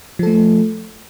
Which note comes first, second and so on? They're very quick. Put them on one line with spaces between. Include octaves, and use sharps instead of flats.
F3 A4 A3